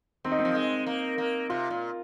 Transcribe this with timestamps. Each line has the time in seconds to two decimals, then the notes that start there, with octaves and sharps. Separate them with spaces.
0.24 D#3 C4
0.32 D#4
0.39 C4
0.45 F3
0.55 G#3
0.87 A#3
1.18 A#3
1.50 C3 F4
1.70 A#2